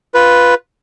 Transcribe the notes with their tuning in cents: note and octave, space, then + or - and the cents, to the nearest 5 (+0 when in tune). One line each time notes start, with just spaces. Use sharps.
F4 +0 B4 +0